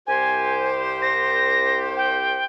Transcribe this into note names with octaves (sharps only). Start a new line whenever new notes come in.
C2 G4 C5 G#5
A#6
G5